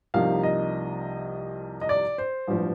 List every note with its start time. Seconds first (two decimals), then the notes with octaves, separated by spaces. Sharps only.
0.14 C2 C3 F3 A#3 D#4 F5
0.43 D#5
1.81 D#5
1.89 D5
2.18 C5
2.47 A1 G2 F3